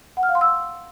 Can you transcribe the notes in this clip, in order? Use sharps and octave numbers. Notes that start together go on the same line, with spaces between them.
F#5
F6
F5
C6
E6